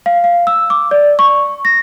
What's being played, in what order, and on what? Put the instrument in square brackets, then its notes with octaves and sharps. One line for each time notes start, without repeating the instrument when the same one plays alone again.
[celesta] F5
F5
E6
D6
D5
C#6
A#6